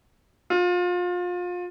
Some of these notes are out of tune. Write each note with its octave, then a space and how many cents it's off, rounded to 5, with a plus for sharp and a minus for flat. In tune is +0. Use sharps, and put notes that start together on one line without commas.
F4 +30